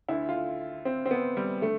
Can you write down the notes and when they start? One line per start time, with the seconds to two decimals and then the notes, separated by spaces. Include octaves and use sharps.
0.09 D2 D3 E4
0.29 F4
0.85 C4
1.06 C4
1.11 B3
1.37 G3
1.62 D3 A3